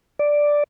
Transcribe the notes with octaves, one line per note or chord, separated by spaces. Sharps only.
D5